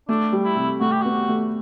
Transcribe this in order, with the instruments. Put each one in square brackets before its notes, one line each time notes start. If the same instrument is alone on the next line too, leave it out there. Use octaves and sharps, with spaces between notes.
[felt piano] A3 [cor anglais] D4
[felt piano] G3
[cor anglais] E4
[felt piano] C3
[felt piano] A3 [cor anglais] F#4
[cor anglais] G4
[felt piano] B3 [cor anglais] F#4
[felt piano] A3